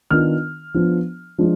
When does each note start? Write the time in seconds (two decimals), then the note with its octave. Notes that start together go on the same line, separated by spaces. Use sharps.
0.11 D#3 B3 D4 F4 F6
0.74 F3 B3 D4 F4
1.38 F3 G#3 D4 F4